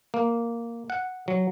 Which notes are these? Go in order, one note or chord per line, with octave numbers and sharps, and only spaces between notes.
A#3
F#5
F#3